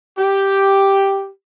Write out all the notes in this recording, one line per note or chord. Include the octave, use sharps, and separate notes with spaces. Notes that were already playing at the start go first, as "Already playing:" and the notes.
G4